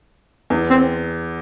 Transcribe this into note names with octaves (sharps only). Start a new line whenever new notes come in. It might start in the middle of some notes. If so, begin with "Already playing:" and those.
E2
C4